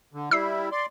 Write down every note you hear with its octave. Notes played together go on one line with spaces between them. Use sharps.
D3
G3 E4 E6 C7
D5 C6